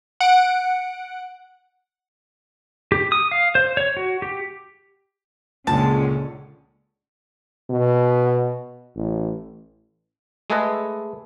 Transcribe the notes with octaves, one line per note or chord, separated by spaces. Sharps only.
F#5 D7
G4
D#6
F5
C5
C#5
F#4
G4
C#2 A#2 D3 G#3 C#4 A5
B2
A1
G#3 A3 G#4 A4 B4 D#5